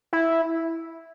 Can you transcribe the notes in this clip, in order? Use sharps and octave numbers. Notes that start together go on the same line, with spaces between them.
E4